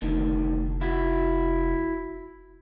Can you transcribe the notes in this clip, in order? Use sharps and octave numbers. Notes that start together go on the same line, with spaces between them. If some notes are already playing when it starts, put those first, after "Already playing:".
F1 D2 D3 D#3
E4 F#4